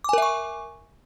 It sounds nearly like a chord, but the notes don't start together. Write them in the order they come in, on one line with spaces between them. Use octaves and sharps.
D6 G#5 A#4 E5 C#6